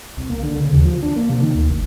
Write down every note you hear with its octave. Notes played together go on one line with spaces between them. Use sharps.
C2
A#3
D3
C#3
D#2
F3
D4
A#3
C3
D#3
D2
F#1